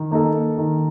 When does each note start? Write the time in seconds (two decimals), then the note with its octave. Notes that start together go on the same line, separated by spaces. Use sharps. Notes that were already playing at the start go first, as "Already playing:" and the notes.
Already playing: D#3
0.11 A#3 D#4 A4
0.58 D#3